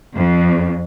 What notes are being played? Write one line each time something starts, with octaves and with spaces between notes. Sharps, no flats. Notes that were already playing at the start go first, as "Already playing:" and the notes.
F2